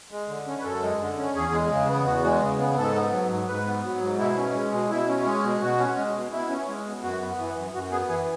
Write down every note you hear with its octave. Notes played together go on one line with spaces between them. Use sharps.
G#3
D3
C#4
B4
F#2 A4
G#3
D3
C#4
E2 G#4
G#3
C#3
B3
E2 F#4
G#3
C#3
B3
G#2 A4
B3
F#3
G#2
G#2 B4
B3
F#3
G#2
B2 E4
C#4
G#3
B2
B2 E4
C#4
G#3
B2
B2 F#4
C#4
G#3
B2
B2 E4
C#4
G#3
B2
F#2 F#4
B3
E3
F#2
F#2 F#4
B3 G#4
E3 G#4